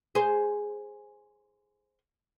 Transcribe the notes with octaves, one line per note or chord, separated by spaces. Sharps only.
G#4 C5